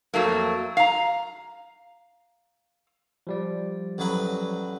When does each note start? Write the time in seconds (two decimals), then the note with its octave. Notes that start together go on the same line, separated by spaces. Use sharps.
0.14 F2 F#3 A3 A#3
0.77 F5 A#5
3.27 F3 G3 D5
3.98 A1 F#3 B4